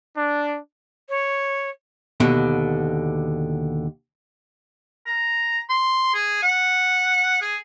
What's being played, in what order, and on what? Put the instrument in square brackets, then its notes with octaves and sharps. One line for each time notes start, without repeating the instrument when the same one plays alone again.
[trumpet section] D4
[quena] C#5
[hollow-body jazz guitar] D#2 B2 D3
[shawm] A#5
C6
G#4
F#5
G#4